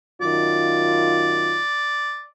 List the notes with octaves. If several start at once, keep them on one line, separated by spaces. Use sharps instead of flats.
F#2 D#3 F4 D5